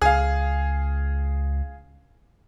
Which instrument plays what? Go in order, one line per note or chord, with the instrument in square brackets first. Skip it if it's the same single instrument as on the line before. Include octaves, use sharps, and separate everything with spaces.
[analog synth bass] C#2 [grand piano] G#4 F5